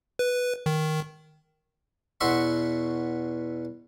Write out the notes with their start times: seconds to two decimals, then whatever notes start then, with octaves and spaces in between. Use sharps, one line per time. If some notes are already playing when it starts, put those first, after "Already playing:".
0.19 B4
0.66 D#3
2.21 E2 B2 F#4 E5 C6 C#6